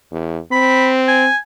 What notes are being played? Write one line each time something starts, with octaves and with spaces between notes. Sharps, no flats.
E2
C4 B5
G#5